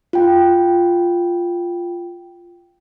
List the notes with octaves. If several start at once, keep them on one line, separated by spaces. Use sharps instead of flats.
F4 G5